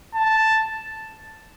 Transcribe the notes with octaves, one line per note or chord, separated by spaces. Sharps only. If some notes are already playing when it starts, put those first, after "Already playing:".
A5